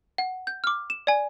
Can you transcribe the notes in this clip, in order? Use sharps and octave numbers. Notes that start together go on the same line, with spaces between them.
F#5
G6
D6 F6
E7
D5 G#5